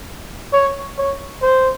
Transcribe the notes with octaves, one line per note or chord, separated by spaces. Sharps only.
C#5
C#5
C5